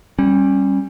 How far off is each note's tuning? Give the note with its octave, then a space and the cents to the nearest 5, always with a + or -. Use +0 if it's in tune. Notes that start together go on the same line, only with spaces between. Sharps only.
G3 +0 C#4 -25